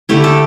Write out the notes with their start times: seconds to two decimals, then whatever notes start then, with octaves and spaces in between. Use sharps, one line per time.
0.09 D3 A3 E4 G4
0.24 A4